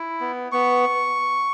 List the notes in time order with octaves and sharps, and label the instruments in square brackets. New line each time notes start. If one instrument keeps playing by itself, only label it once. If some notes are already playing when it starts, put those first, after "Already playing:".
Already playing: [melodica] E4
B3
B3 C#6